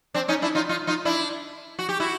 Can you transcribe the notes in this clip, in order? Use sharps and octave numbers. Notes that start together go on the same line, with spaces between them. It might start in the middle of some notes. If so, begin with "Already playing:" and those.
C4 D4
C#4 D#4
D4 E4
D#4 F4
D#4 F4
D#4 F4
D4 E4
F#4
G4
E4 F#4